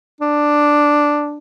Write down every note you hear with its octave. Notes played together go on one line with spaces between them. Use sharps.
D4